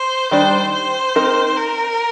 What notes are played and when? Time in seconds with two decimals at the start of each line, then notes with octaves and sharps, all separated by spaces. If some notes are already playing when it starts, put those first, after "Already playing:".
Already playing: C5
0.31 D#3 G3 D4 C5
0.73 C5
1.15 C4 D#4 A#4
1.57 A#4